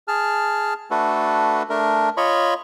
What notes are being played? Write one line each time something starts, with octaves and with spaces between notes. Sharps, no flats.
G#4 A5 F6
A3 D4 F#4 A4 B4
A3 D4 A#4
F4 C#5 D#5 B5 C#6